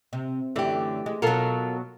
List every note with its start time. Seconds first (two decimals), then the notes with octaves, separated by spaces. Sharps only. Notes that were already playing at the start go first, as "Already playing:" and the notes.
0.13 C3
0.56 F#2 D3 E3 A3 G4
1.06 G#3
1.22 B2 F#3 F4 A4 A#4